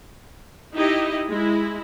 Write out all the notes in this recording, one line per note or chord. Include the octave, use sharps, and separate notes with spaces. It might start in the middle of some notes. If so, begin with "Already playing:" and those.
D#4 E4 G4 D#5
G#3 E4